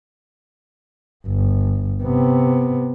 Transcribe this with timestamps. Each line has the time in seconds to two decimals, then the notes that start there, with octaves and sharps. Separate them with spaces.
1.27 G1
2.04 C3 B3